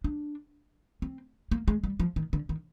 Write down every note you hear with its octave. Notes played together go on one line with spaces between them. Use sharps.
D4
C4
A#3
G#3
G3
F3
D#3
D3
D#3